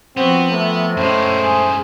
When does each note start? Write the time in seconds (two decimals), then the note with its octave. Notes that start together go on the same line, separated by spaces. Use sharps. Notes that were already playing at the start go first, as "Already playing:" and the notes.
0.17 F3 B3 C4 F#4
0.51 C3 A3
0.97 F#2 A2 G#3 C5
1.40 G#4